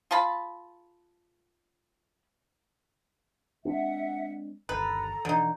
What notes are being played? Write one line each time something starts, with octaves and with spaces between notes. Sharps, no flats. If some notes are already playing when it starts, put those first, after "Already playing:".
F4 G#4 A5 B5
G#3 C4 D4 E5 F#5
G1 D#2 A4 B4 A#5
B2 D3 E3 F3 D#4